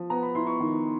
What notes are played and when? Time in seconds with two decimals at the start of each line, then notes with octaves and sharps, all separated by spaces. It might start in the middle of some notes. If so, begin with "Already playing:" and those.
Already playing: F3
0.10 B3 A#5
0.23 B5
0.35 E4 C6
0.47 C#6
0.60 D#3